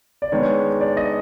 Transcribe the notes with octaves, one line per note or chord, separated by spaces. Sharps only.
D5
D#3 G#3 B3 D4 C#5
D5
D#5